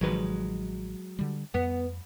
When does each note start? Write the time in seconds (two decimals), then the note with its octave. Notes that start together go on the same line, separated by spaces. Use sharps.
0.01 A1 D#3 F3 F#3 G#3 B4
1.19 D3 G3
1.54 F2 B3